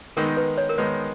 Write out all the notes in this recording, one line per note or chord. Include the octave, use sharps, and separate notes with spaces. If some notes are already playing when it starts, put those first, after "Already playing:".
D#3 G#3 B3 D#4 A#4
B4
C#5
A#4
D#3 G#3 B3 D#4 B4